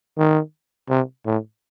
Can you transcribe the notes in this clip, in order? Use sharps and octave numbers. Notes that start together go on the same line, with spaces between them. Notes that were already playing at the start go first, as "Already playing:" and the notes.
D#3
C3
A2